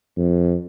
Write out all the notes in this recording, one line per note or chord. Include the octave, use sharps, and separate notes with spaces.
F2